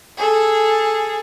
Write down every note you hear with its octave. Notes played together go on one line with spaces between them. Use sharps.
G#4 A4